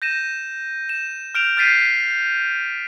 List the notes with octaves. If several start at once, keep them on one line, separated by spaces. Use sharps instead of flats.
G6 A#6 D#7 E7
E7
F6 G6 D7 E7 F7
F6 G6 A6 B6 C7 D#7